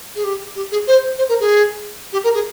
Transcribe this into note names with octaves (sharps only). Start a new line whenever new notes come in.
G#4
G4
G4
G#4
C5
C5
A#4
G#4
G4
A#4
G#4